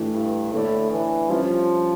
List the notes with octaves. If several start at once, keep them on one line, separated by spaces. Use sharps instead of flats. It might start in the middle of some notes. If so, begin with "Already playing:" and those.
Already playing: A2 E3 A3 D4 G4
G2
A2 D3 A3 E4 A4 D5
E3
F3 G3 C#4 F4 C#5